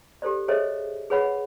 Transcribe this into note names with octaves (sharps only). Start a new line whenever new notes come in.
G4 A4 C5 D5
G#4 A4 C5 C#5 D#5 E5
G#4 B4 C#5 F#5 B5